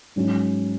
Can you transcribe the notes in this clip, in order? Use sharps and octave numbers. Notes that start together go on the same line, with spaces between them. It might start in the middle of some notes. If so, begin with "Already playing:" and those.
G#2 F#3 C#4